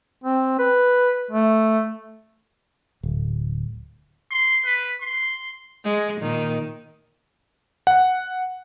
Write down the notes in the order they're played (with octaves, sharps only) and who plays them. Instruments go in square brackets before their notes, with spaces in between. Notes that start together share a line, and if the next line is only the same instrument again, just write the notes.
[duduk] C4
B4
A3
[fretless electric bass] D1
[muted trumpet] C6
B4
C6
[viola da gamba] G#3
A#2 D#3
[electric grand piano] F#5